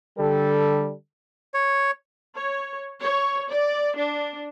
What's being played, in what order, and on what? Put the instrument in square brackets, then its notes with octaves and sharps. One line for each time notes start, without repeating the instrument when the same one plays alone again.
[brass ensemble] D3 G3 A4
[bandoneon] C#5
[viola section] C#5
C#5
D5
D4